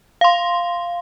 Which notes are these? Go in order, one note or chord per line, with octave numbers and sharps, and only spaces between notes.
F5 C6